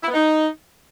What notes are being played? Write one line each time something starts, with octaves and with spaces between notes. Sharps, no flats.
E4
B3
D#4